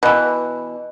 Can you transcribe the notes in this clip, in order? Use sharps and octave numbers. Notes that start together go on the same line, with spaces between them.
B2 E3